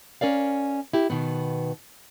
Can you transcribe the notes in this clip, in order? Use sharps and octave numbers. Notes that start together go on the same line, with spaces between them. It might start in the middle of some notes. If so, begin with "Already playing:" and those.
C#4 A#4 D5 F5
E4 G4
B2 D#3 B3